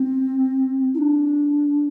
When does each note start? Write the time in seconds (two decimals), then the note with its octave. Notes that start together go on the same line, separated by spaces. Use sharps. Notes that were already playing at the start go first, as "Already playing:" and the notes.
Already playing: C4
0.94 E4
0.98 D4